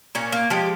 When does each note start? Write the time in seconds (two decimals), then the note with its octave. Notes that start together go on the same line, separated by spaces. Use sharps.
0.15 A#2 C#4
0.32 A#3
0.50 F3 G#3 G4